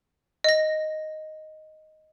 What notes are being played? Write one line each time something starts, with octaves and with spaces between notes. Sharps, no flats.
D#5 A#6